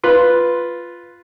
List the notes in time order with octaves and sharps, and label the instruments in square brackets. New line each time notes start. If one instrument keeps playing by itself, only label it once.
[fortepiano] F4 B4